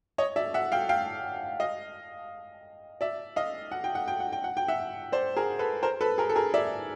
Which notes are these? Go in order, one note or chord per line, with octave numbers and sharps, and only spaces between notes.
C#5 D#5
D5 E5
E5 F#5
F5 G5
F5 G5
D#5 F5
D5 E5
D#5 F5
F#5
G5
F#5
G5
F#5
G5
F#5
G5
E5 F#5
C5 D5
G#4 A#4
A4 B4
A#4 C5
A4 B4
G#4 A#4
A4
G#4 A#4
D5 E5